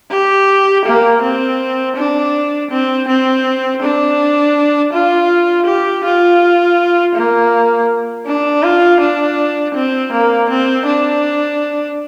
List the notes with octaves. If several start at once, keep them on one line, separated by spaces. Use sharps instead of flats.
G4
A#3
C4
D4
C4
C4
D4
F4
G4
F4
A#3
D4
F4
D4
C4
A#3
C4
D4